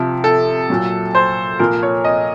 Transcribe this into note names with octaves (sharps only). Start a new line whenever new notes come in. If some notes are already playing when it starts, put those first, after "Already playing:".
Already playing: C3 F3
A4
A#2 F#3
C5
A#2 F3 A#4
C#5
D#5